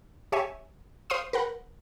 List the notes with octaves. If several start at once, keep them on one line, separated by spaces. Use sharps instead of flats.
G4 C#5 E5 G#5
C5 F5 C6 D#6
A#4 B4 F#5